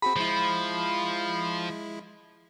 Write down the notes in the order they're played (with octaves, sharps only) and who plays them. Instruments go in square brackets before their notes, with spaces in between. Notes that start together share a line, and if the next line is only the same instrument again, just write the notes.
[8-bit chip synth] C4 F#4 G#4 [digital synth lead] B5
[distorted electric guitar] F3 [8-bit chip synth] G#3 E4